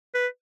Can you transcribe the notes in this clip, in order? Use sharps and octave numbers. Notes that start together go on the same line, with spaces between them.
B4